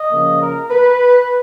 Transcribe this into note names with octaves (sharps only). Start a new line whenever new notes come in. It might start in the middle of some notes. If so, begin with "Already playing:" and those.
Already playing: D#5
C#3 F3 A#3
A#4
B4